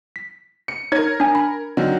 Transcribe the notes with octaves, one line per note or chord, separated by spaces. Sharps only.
B6
C#7
D#4 A#4 C#5 G#6
D4 G#5
B5
D3 D#3 F#3